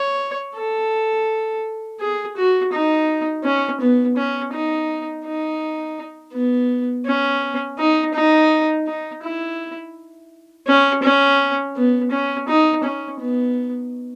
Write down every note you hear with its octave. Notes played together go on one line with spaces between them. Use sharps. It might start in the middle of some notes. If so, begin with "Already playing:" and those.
Already playing: C#5
A4
G#4
F#4
D#4
C#4
B3
C#4
D#4
D#4
B3
C#4
D#4
D#4
D#4
E4
C#4
C#4
B3
C#4
D#4
C#4
B3